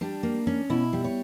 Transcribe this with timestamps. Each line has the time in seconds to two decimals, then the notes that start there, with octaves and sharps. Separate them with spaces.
0.01 G3 D4
0.23 A#3
0.47 C#4
0.70 B2 E4
0.93 G3
1.04 C#5